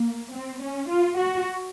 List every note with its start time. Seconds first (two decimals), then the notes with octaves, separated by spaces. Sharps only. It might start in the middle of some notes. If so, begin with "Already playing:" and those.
Already playing: A#3
0.33 C4
0.61 C#4
0.89 F4
1.18 F#4